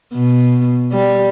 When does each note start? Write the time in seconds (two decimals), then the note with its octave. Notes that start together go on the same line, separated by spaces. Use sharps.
0.13 B2
0.92 G3